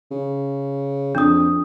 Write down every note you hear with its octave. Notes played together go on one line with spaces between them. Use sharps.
C#3
F2 D4 D#6